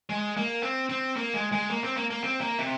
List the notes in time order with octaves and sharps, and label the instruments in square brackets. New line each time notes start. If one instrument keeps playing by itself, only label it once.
[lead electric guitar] G#3
A#3
C4
C4
A#3
G#3
G#3
A#3
C4
A#3
A#3
C4
A#3
C3